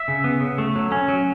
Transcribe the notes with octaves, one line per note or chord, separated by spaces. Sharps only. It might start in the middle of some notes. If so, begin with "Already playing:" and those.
Already playing: E5
C#3
B3
C#3
A3
F#3
C#4
F#3